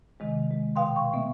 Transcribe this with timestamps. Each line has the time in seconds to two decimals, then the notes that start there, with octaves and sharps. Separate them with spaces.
0.20 C3 D#3 G#3
0.51 G#3
0.76 B2 F5 G5 C6
0.96 C#6
1.13 A3 B3 E5